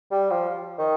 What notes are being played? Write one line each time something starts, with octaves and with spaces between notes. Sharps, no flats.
G3
F3
D#3